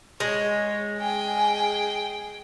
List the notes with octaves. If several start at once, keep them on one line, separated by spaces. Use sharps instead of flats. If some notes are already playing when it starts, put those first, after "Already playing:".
G#3 C#5
G#4 G5 G#5